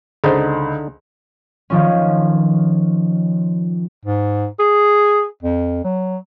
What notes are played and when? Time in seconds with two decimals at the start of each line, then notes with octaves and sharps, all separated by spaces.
0.24 C#2 D3 D#4 G#4 C5
1.70 D#3 F3 C#4
4.05 G#2
4.59 G#4
5.42 F2
5.84 F#3